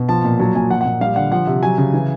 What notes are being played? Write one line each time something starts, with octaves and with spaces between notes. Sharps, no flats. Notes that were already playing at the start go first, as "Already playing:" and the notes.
Already playing: B2
F3 A5
A#2
F#3 A5
A#2 G#5
F3 F#5
F#5
A#2
G3 F5
D3 F#5
F3 F#5
C3
F#3 G#5
C#3
E3